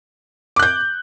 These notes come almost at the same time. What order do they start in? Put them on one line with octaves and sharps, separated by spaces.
D6 F#6 G6